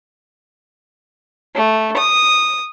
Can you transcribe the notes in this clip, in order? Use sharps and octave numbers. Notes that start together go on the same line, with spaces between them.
A3
D#6